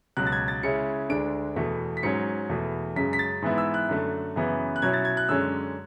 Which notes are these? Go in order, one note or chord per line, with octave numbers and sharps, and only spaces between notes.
C#2 B2 F#3 F#6
A6
G#6
A6
C#3 G#3 C#4 E4 C#7
D2 D3 G#3 D4 D7
E2 B2 A3
B6
G#2 F#3 C#4 C#7
E2 B2 A3
F#2 C#3 G#3 B6
B6
A6
G#2 E3 B3 E4
E6
F#6
F#2 D3 A3
F#2 C#3 E3 B3
F#6
B2 F#3 C#4 E4 G#6
A6
G#6
F#6
F#2 D3 G#3 C#4 E6